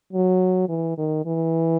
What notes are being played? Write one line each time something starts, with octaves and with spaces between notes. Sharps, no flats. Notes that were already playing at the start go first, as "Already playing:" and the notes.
F#3
E3
D#3
E3